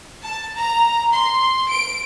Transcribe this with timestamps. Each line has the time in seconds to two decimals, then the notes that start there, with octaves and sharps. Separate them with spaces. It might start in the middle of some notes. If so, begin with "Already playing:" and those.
0.23 A5
0.57 A#5
1.13 C6
1.69 D7